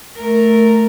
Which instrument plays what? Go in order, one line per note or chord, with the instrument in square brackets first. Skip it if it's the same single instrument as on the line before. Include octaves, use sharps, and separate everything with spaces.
[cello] A3 A#4